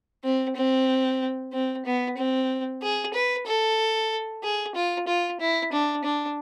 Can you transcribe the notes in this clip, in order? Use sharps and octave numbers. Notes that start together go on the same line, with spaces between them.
C4
C4
C4
B3
C4
G#4
B4
A4
G#4
F4
F4
E4
D4
D4